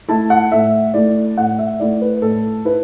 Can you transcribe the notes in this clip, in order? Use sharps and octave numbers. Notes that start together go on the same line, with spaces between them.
A3 E4 A5
F#5
A2 E5
A3 E4 D5
A2 F#5
E5
A3 E4 D5
B4
A2 A4
E4 B4